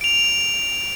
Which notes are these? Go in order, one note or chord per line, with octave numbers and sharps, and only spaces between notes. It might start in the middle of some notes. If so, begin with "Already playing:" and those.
D7 F7